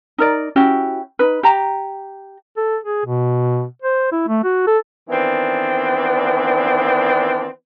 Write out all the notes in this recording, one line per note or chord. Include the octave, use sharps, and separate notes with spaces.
D#4 A#4 D5
C#4 E4 F#4 G4
D#4 B4
G4 A#5
A4
G#4
B2
C5
E4
A3
F#4
A4
D#3 E3 B3 C4 D4